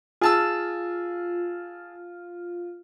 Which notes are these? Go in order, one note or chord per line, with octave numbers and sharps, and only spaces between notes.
F4 G#4 A5 E6